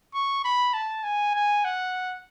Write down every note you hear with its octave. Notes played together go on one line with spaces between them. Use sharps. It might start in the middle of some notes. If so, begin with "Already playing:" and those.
C#6
B5
A5
G#5
G#5
F#5